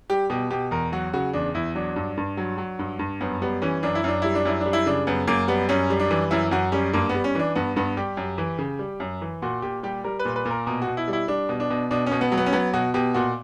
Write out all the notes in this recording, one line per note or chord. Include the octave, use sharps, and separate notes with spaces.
G3 G4
B2 G4
B2 G4
E2 A#4
F#3 F#4
C#3 F#4
E2 D4
E2 E4
F#3 D4
G2
G2
F#3
F#3
G2
G2
F#2 B3
G3 B3
E3 C#4
F#2 D4
E4
F#2 D4
G3 E4
D4
F#2 E4
D4
G3
E4
C#3 D4
F#2 B3
F#2 A#3
G3 B3
F#2 C#4
G3
D4
E3
F#2 E4
F#2 F#4
G3 C#4
G2 A#3
B3
G3
C#4
E3 D4
G2 B3
G2 B3
G3 G4
F#2
E3
C#3
G3
F#2
E3
A#2 F#4
A#2 G4
G3 G4
G3 A#4
B4
A#2
B4
A#2
A#4
B2 A#4
F#4
B2
E4
G3
E4
G3 D4
B2
D4
B2
B2 D4
C#4
B2
B3
F#3
B3
C#4
F#3 B3
B2 F#4
B2 G4
A#2 F#4